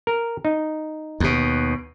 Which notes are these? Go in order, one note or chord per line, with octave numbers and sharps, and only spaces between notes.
A#4
D#4
D#2 B2